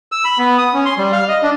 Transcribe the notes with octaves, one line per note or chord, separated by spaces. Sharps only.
E6
B5
B3
D#6
C#4
C6
G3
F5
D#5
D4